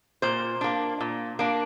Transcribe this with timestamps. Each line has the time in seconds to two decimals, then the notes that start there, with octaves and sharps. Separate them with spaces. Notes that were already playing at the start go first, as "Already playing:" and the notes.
0.22 A#2 C5
0.61 A#3 D4
1.00 A#2
1.39 A#3 D4